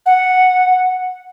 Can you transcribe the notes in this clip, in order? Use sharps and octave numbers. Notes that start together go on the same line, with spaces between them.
F#5